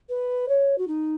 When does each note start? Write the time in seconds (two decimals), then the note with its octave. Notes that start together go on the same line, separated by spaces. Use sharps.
0.09 B4
0.48 C#5
0.78 F#4
0.88 D#4